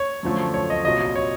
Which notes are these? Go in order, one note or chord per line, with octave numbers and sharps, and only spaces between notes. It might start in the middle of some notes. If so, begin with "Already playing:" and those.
Already playing: C#5
F#2 D3 F3 A3
C#5
D#5
C2 A#2 F#3 D#5
C#5